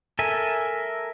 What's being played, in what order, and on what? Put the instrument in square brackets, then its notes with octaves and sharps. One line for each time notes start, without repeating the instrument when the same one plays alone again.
[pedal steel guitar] A4 A#4 E5 G#5